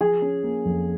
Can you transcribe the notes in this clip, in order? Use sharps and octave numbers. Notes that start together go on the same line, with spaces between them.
F3 G#4
C#4
A#3
F2